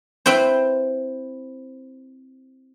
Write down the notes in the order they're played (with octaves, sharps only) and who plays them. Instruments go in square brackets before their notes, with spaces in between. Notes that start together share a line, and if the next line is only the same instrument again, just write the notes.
[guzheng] C4 E4 B4 C5